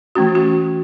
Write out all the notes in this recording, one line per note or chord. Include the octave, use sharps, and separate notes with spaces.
E3 A3 C#4 F#4
F#4